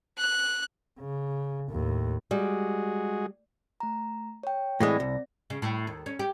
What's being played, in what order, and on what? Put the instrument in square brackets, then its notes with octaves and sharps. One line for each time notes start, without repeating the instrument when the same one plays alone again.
[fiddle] F#6
[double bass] C#3
D#2 A2
[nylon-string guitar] G3 [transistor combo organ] G#3 F#4 G#4
[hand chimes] A3 A#5
C#5 G5
[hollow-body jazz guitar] A2 E3 G#3 [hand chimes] C4 D5 A#6
[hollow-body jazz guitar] C2
[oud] C#3
A2
D#2
C#4
G4